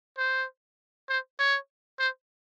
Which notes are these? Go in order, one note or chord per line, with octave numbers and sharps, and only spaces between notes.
C5
C5
C#5
C5